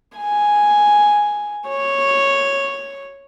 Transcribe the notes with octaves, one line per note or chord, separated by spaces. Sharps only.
G#5
C#5